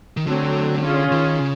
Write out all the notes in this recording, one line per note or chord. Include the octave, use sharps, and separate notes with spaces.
D#3
D3 F#3 A3 C4
C#4 F4 G#4
D#3
C#3